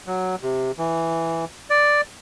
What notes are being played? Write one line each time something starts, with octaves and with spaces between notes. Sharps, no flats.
F#3
C3
E3
D5